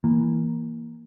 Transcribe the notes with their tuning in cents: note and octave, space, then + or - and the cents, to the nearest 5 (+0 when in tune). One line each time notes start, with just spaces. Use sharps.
E3 +0 A#3 +0